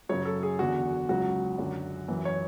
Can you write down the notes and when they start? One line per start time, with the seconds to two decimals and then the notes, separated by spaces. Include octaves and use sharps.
0.09 F#2 C#3 F#3 C#5
0.25 A4
0.43 G#4
0.59 E2 D3 F#3 F#4
1.09 C#2 C#3 F#3 F#4
1.58 F#2 D3 F#3
2.08 F#2 E3
2.25 C#5